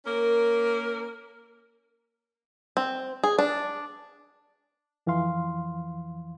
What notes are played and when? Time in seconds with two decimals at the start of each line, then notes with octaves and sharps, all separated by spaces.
0.06 A#3 C#4 A#4
2.77 C4
3.24 G#4
3.39 D4
5.07 F2 E3 F3 F5 C6